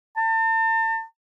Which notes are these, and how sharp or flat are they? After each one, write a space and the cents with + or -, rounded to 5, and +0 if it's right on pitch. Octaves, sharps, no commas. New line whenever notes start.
A5 +40